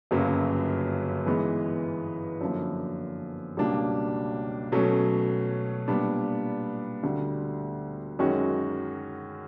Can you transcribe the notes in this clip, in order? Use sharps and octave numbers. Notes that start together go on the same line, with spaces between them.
G1 F#2 C#3 F#3 A#3
G#2 E3 G#3 B3
F#2 D3 F3 A#3
C#2 B2 G3 A#3 D4
B2 F#3 A3 C#4
A#2 G3 B3 D4
D2 D3 G3
F#2 D#3 G#3 C#4 F#4